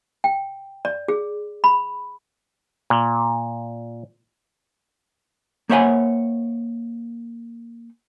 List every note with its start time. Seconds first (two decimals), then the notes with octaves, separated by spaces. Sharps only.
0.24 G5
0.85 D5
1.08 G#4
1.64 B5
2.90 A#2
5.69 A#3 C5 C#5 E5 F#5 G#5